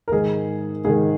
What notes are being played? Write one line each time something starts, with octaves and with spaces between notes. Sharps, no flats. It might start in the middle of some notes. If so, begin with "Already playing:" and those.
A#4
G#2 D#3 G#4
G#2 D#3 G#4